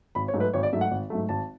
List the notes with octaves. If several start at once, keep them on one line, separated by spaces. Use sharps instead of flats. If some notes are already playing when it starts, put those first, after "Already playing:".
G#1 B5
C#5
G#2 F#3 A3
B4
G#1 C#5
D5
G#2 F#3 A3 E5
F#5
G#1
G#2 F#3 A3
G#1 A5